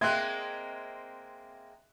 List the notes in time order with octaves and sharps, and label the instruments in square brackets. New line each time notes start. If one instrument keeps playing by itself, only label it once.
[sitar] G#3 A#3 C4 [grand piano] E5 C6 [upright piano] F#6 G#6